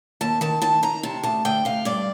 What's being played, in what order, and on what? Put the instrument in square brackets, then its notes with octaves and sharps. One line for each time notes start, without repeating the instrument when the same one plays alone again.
[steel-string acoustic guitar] D#2 A5
D#3 A5
D#3 A5
D#3 A#5
C3 A5
D2 A5
D2 G5
C3 F5
G2 D5